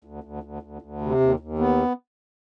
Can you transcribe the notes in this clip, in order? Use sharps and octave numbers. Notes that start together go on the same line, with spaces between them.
D2
D2
D2
D2
D2
C3
D#2
D#2
B3